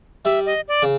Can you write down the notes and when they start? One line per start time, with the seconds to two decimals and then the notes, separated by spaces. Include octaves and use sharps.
0.25 G3 E5
0.46 D#5
0.68 D5
0.82 C#3